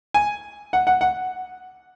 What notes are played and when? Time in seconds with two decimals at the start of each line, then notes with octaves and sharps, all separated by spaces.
0.14 G#5
0.73 F#5
0.87 F#5
1.01 F#5